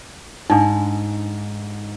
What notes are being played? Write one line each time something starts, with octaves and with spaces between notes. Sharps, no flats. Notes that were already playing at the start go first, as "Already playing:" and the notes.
G#2 D4 D#4